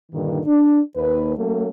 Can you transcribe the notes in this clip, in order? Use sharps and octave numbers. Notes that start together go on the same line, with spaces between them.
G2 A#2 D3 D#3
D4
D#2 B4
F#3 A3 A#3 C#4 A4